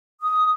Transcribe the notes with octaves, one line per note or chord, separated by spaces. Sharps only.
D#6